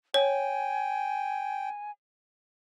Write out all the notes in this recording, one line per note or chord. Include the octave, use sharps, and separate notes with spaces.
C#5 G5 G#5